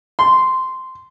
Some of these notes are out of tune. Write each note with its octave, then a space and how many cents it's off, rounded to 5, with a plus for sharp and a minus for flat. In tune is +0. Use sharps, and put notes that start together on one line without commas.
C6 -10